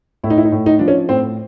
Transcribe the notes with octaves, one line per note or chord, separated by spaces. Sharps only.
A2 E4
D#4
E4
D#4
A2
D#4
F3 D4
C#4
A2 C4